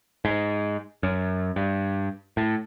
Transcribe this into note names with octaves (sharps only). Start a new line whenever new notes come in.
G#2
F#2
G2
A2